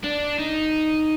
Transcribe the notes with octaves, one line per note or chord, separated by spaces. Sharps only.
D4
D#4